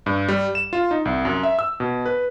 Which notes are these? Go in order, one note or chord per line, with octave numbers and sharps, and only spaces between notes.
G2
G3
E7
F4
D#4
C2
F#2
E5
E6
B2
B4